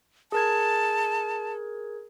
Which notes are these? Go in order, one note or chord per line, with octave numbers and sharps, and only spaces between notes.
G#4 A#4 A5 G#6